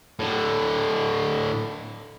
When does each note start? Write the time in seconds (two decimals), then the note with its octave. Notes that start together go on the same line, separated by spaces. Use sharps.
0.19 A2 D3